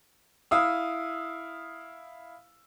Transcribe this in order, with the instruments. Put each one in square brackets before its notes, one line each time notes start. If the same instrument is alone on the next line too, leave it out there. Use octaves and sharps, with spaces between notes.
[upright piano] E4 F5 D#6 E6